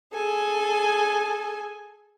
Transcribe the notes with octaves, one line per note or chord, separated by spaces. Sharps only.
G#4 A4 G#5